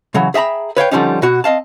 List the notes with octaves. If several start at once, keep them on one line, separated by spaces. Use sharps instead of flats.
C#3 E3 F#3
G#4 E5 G5 A#5 B5
B4 C#5 F5 G5
D3 E3 F3 G3 C#4 D#4
B2 F#4
C4 D#5 F5 A5